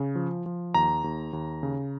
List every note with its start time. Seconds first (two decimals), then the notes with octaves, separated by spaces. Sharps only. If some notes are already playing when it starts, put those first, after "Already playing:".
Already playing: C#3
0.15 F3
0.46 F3
0.74 D#2 A#5
1.04 D#2
1.33 D#2
1.63 C#3